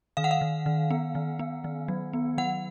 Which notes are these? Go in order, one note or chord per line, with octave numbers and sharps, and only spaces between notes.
D#3 F5
F#5
F5
D#3
D#3
B3
D#3
B3
D#3
F#3
B3
F#3 F#5